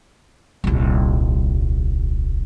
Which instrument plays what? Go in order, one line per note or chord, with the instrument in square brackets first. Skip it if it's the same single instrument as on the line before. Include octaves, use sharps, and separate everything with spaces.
[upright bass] D#1 C2